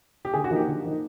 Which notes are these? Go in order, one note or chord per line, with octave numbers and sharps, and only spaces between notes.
G4
D3 G#4
F#4
F3 A#3 D#4
G4
D3
F3 A#3 D#4